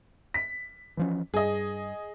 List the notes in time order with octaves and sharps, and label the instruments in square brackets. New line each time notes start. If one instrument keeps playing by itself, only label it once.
[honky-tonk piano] B6
[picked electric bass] E3 F3 C#4
[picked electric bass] G2 [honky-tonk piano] G#4 D#5